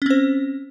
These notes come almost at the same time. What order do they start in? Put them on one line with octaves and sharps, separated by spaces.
C#4 C4 C5